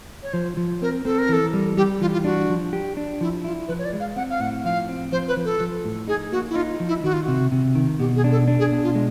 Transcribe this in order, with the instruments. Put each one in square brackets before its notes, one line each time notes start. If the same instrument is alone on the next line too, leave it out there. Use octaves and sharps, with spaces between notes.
[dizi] C#5
[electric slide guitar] F3 [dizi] C5
[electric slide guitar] F3
[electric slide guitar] C4 [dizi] A#4
[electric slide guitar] C4 [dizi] A4
[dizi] A#4
[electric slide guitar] E3 [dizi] A4
[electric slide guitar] G3
[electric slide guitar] G3 [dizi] G4
[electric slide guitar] E3 [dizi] F4
[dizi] F4
[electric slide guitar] D4 [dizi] F#4
[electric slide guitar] F3
G4
D4
[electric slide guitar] F3 [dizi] E4
[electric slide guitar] E4 [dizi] F4
[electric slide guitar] F3 [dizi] B4
[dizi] C#5
D5
[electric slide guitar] G#3
[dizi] F5
[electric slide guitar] C4 [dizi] F#5
[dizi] F5
[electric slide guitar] A2 [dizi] F#5
[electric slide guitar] F3 [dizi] F5
[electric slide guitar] C4
[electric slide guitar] F3 [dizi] C5
[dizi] B4
[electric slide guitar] F3
[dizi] A4
[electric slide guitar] F3
A2
[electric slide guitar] D#4 [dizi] G#4
[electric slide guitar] A#3 [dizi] F#4
[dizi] E4
[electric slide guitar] D#4 [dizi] F4
[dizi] F4
[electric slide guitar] F3
[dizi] E4
[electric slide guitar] D#3 [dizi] F#4
[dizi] F4
[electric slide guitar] C3 [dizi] F#4
[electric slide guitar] C3
D#3
[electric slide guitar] B2 [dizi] G4
[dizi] G#4
[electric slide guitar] D4
[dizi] A4
[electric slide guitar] D4
[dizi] G#4
[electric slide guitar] B2
[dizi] F4
[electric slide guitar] G#3